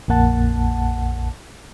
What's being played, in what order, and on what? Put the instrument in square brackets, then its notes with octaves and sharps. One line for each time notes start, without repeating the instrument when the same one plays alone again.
[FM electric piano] A#1 F2 A#3 F#5 A5